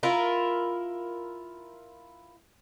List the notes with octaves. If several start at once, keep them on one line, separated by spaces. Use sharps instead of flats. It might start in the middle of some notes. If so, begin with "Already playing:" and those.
E4 F4 A#4